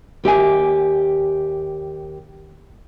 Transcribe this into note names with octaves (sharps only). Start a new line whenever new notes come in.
D#2 G4 E5 G#5